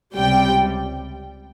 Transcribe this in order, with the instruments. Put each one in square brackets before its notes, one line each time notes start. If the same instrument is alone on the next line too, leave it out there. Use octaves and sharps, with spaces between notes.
[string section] C#2 C3 G3 G5